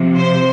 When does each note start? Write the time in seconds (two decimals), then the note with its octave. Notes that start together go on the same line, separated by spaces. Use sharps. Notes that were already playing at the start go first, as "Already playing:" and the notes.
Already playing: C3 F3
0.15 C5